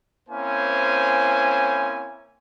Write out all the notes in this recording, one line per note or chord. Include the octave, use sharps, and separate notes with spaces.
A#3 C4 C#4 E4 C5 G#5